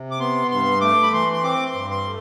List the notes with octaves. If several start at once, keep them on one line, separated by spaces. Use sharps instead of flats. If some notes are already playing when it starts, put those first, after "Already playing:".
Already playing: C3
D6
B3 C6
G2 C6
A3 D6
B5
E3 C6
C6
C4 D6
C6
G2
C6
A3